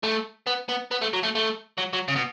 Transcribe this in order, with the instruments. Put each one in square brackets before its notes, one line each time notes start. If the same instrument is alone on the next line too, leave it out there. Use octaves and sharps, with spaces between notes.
[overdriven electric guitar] A3
B3
B3
B3
A3
F#3
A3
A3
F#3
F#3
C#3
B2